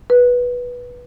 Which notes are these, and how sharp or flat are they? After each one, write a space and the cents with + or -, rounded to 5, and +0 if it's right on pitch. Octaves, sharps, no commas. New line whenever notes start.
B4 -10